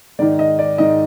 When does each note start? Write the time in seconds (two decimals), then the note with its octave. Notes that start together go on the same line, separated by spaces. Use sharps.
0.19 G#2 D#3 D5
0.39 D#5
0.59 D5
0.78 G#2 D#3 D#5